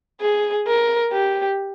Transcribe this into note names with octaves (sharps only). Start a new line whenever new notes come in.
G#4
A#4
G4